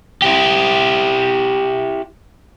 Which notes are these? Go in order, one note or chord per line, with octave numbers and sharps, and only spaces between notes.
E4 G4